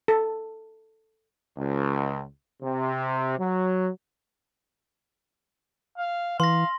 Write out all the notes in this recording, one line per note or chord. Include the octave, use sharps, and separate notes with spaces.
A4
C#2
C3
F#3
F5
E3 F5 C6 A#6